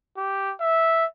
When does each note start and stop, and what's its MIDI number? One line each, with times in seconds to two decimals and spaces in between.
0.17 0.53 67
0.60 1.05 76